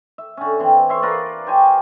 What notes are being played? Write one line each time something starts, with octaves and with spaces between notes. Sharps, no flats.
E5
D3 C#4
E3 C4
C#5 E5 C6
F4 A#4 B4 D5
G4 C5 C#5 G#5